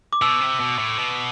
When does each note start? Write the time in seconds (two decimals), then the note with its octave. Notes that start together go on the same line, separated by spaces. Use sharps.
0.13 D6
0.22 B2 E6
0.41 C3
0.60 B2
0.79 A2
0.98 B2